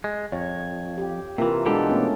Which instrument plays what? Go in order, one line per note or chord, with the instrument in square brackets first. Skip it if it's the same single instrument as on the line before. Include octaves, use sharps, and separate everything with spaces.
[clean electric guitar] G#3
[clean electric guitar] F2 [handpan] C#5
[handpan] G4
[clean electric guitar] C3 E3 [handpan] A#3 F4
[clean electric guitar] B2 E3 G4 [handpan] G#3 D4 A4
[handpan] A3 B3 C#4